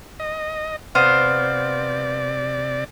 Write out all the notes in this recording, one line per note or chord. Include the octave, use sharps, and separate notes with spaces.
D#5
C3 B3 C5 D5 F5